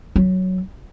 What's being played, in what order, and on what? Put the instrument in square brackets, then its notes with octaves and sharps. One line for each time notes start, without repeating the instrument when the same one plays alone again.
[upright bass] F#3